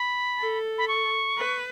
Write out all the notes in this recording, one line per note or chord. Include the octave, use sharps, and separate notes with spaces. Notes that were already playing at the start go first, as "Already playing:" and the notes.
Already playing: B5
A4
B5
C#6
B4